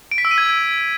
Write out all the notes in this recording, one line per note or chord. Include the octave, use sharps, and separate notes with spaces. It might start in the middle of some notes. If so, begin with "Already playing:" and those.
D7
B6
E6
D#7
G#6